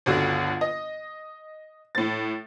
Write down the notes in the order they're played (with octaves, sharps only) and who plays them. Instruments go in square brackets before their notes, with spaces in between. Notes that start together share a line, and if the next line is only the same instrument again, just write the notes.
[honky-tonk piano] G1 C#2 D3 F#4
D#5
A2 A6